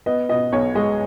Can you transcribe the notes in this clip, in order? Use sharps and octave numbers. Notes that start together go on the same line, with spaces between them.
B3 D#5
B2 D#5
B1 C#5
G#3 D#5